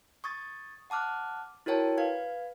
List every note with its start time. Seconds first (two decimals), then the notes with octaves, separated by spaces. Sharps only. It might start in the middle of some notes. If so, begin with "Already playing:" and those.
0.24 C#6 D#6 G#6 A6
0.90 F#5 A5 D6 F6 F#6
1.66 E4 F#4 A#4 C#5 G5 A5
1.98 B4 F5 G#6